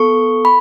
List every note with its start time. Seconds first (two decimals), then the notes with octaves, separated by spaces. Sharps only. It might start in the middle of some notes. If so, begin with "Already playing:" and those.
Already playing: B3 A4 C#6
0.45 B5